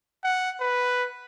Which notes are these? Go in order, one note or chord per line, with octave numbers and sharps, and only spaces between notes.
F#5
B4